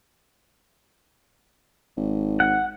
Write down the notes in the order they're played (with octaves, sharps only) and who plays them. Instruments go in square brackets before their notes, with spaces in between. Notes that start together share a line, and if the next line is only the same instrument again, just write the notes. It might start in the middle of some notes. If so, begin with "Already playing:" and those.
[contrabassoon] G#1
[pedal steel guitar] F#5